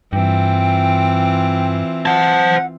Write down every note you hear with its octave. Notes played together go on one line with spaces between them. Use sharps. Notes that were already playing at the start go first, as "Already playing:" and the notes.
G2 E3 C4 F4 G5
C5 F#5 A5